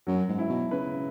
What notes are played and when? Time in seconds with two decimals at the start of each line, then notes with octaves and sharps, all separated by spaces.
0.07 F#2 F#3
0.29 G#2
0.39 E4
0.49 B2
0.71 C#3 B4